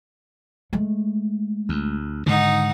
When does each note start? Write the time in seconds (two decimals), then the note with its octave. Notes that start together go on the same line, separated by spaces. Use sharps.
0.73 G#3 A3
1.69 D2
2.26 G#2 D3 D#3 D#4 F#5